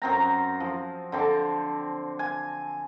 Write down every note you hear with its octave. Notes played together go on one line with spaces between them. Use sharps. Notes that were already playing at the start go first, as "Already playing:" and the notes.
F#2 C4 A#5
F3
D3 C4 A5 D6
G#5